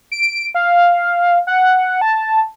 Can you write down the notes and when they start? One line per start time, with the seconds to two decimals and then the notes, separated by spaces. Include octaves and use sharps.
0.12 D7
0.55 F5
1.47 F#5
2.01 A5